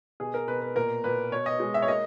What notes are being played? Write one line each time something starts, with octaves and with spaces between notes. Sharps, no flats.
B2 G#4
A#4
B2 B4
B4
A#2 A#4
A#2 B4
B2 C#5
D#5
G#3
E5
C#5
A#3 D#5